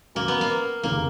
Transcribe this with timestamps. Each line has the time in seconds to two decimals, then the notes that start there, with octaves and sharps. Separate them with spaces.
0.15 D#2 D#3 F#3 A#3 C#4
0.28 B3
0.41 A#3
0.83 F1 D#2 C#3 A#3